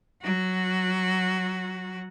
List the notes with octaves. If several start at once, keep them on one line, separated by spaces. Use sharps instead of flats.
F#3 F#4